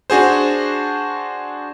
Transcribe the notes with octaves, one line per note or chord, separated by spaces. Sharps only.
D4 F#4 G#4 C5